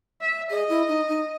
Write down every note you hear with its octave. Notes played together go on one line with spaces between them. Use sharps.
E5
G#4 D#5
E4
D#4
D#4